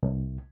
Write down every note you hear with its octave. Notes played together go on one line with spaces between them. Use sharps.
C2